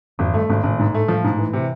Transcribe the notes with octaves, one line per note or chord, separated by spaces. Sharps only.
G#1 F2
G2 A3
G#1 G#2
G#1 A2
G#2
A3
F3
G#2
E3
C3